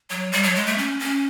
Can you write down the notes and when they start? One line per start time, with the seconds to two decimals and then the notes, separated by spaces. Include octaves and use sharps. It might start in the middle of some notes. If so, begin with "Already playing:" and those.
0.10 F#3
0.32 G3
0.43 F#3
0.55 G#3
0.66 A3
0.78 C#4
0.99 C#4